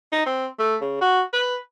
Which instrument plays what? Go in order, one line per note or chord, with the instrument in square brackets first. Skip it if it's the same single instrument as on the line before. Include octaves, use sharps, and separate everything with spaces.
[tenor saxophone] D#4
C4
A3
C#3
F#4
B4